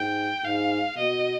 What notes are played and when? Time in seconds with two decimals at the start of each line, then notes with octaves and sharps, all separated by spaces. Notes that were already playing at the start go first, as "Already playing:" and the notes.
Already playing: G#2 G5
0.44 G#2 F5
0.97 B2 D#5